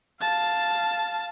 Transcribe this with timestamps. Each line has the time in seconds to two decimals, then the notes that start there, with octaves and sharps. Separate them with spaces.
0.21 F5 A5